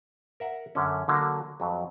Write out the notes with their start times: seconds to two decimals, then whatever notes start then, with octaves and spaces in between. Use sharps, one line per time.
0.40 A#4 E5 F#5
0.75 F#2 D3 C#4
1.08 D3 F#3 A#3
1.60 F2 F#3